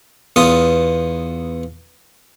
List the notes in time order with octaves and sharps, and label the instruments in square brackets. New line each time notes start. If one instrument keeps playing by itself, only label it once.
[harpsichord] E2 B3 F4 D#6